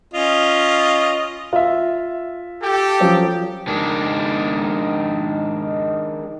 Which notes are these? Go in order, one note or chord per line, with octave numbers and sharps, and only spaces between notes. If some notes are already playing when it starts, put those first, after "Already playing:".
C#4 F4 D#5
F4 E5
G4 A4
F3 F#3 C#4
D#3 G#3 D4